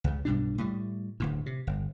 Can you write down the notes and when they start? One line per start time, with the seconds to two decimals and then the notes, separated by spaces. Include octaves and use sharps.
0.04 C#2 C#3
0.25 B1 G2 B2 D4
0.58 A2 G3
1.20 D1 D2 A2
1.46 C3
1.67 G1